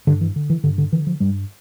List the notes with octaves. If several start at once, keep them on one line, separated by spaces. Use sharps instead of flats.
G2 D3
E3
D3
E3
G2 D3
D3
D3 E3
F3
G2 G3